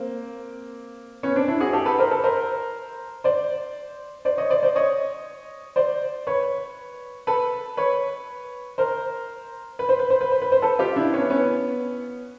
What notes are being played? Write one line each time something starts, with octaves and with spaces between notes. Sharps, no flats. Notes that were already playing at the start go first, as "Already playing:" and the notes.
Already playing: A#3 C4
B3 C#4
C4 D4
D4 E4
F#4 G#4
G4 A4
A4 B4
A#4 C5
A4 B4
A#4 C5
C5 D5
C5 D5
C#5 D#5
C5 D5
C5 D5
C#5 D#5
C5 D5
B4 C#5
A4 B4
B4 C#5
A#4 C5
B4
C5
B4
C5
B4
C5
B4
C5
A4 B4
F4 G4
D4 E4
B3 C#4
B3 C#4